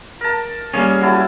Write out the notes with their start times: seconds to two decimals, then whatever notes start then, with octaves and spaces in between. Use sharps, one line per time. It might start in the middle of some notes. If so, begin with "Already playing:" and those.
0.21 A#4 A5
0.73 G3 A#3 C#4 G#4
1.01 F#3 E4 A5